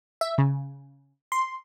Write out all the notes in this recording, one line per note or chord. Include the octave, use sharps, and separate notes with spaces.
E5
C#3
C6